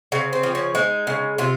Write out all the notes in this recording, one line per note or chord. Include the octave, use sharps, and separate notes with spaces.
C#3 C4
C4
F3
C#4
G#3 D#4
C#3
C3 F4